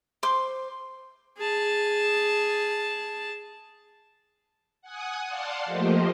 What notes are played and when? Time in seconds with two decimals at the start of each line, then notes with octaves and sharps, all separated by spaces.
0.23 C5 C6 D6
1.38 G#4 A5
4.82 F#5 G#5 D#6
5.27 D5 F5 F#5 A5 C6
5.66 F3 A3 A#3 G4 C5 D#5